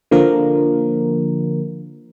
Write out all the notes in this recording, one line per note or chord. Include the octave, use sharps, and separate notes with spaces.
D3 F3 A#3 A#4